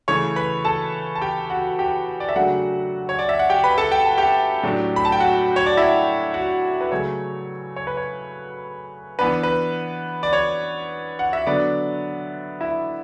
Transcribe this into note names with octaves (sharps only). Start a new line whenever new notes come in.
C#3 E3 A3 C#5 C#6
B4 B5
A4 A5
A5
G4 G5
F#4 F#5
G4 G5
D5
E5
C#3 F#3 A3 D4 F#4 F#5
C#5
D5
E5
F#5
G4 G5
B4 B5
A4 A5
G5
A5
G4 G5
A2 F#3 A3 D4
B5
A5
G5
F#4 F#5
C#5
D5
E4 E5
F#4 F#5
B4
C#3 F#3 A3 C#5
C#5
B4
C#5
E3 B3 D4 B4
B4
D5
C#5
F#5
E5
D3 F#3 B3 D4 D5
E4 E5